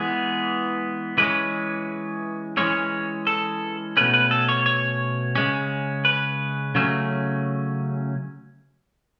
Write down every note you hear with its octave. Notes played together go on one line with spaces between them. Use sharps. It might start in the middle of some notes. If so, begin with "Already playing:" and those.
Already playing: E3 G#3 B3 G#4
E3 G#3 C#4 B4
E3 G#3 C#4 C#5
A4
B2 A3 C#4 B4
B4
A4
C#5
C#5
C#3 G#3 C#4
B4
C#3 F#3 A3 C#4